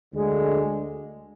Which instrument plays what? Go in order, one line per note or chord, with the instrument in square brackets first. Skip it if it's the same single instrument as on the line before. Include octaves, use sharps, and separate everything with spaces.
[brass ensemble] D2 D3 G#3